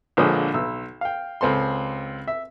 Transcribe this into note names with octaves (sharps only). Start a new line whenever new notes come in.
A#1 D3 F3 G#3 C#5 D#6
B1 E6
F5 G5
C#2 C4 A4 C6
E5